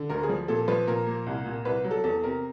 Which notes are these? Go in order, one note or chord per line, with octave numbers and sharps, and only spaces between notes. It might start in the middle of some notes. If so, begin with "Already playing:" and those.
Already playing: D3
D2 A#4
G#4
F3
A#2 A4
F3 B4
A#2 A#4
A#3
C2
A#2
C2 B4
F#3
A4
E2 A4
C3 A#4